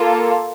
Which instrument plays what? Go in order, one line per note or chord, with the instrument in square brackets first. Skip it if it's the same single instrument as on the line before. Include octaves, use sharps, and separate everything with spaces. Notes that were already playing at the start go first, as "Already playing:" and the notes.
Already playing: [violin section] A#3 F4 A4